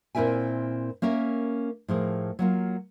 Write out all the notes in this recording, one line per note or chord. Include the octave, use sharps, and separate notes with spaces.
A#2 C4 E4 A#4 E5 G#5
A#3 C#4 A#4 E5
A2 F3 G#4 A#4
F#3 A#3 F4